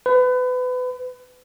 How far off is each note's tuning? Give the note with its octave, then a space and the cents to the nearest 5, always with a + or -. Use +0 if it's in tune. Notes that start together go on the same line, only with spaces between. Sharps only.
B4 +30